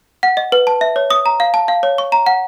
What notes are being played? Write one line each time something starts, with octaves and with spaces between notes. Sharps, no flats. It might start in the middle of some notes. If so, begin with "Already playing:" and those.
F#5
D#5
B4
A5
E5
C#5
D#6
A#5
F5
A5
F5
C#5
C#6
A#5
F#5